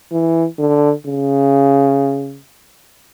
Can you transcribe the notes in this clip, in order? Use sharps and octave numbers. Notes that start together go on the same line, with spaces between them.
E3
D3
C#3